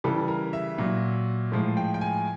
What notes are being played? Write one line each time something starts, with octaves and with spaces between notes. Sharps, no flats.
C#3 E3 G3 A4
A#4
E5
A#2 F#3
A2 F3 G#3
G5
G5
G#5